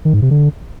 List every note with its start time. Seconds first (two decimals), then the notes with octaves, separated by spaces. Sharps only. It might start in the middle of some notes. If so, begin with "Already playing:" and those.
0.05 D#3
0.14 G#2
0.22 C3
0.31 D3